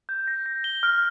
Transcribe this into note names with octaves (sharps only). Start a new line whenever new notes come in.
G6
A#6
A#6
G7
F6